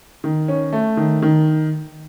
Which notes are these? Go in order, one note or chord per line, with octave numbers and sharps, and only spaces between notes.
D#3
C#4
A3
D#3
D#3